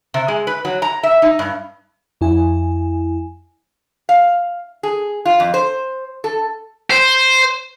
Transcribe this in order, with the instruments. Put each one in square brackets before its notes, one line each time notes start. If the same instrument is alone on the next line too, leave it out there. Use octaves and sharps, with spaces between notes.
[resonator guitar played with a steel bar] C3
G#3
B4
F#3
A#5
E5
D#4
G2
[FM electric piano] F2 E4 G#5
[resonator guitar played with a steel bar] F5
G#4
F4
F2
C5
A4
[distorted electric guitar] C5